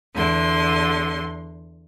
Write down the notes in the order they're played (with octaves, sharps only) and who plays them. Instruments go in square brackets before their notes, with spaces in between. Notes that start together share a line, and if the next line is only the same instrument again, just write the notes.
[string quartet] E2 D3 C6